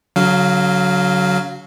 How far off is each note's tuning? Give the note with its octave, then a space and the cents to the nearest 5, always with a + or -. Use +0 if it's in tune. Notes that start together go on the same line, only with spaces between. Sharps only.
D3 -45 F#3 +0 F5 +0